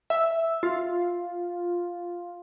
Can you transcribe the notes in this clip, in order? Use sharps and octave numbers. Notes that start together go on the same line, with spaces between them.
E5
F4